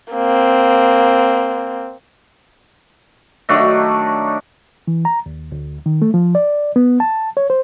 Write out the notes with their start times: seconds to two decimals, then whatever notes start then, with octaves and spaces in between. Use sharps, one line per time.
0.13 A#3 C4
3.49 D#3 F#3 A3 D4
4.88 E3
5.05 A#5
5.26 D#2
5.52 D2
5.86 D#3
6.02 A3
6.14 F3
6.35 D5
6.76 B3
7.00 A5
7.37 C#5
7.50 C5